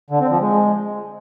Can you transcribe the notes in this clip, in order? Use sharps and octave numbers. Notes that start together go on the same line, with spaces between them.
D3
C4
F3
G#3